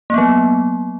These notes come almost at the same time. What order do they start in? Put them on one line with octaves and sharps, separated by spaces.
A#3 B3 F#3